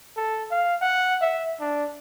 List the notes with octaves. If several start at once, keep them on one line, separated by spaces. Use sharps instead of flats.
A4
F5
F#5
E5
D4